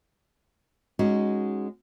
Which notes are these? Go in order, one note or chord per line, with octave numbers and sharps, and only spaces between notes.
G#3 C#4 D#4 F#4